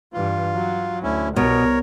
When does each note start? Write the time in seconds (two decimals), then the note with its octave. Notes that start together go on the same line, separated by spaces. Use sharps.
0.13 G2 E3 F4
0.55 F#3
1.03 D2 C#4 E4
1.36 C2 B2 A#4 C#5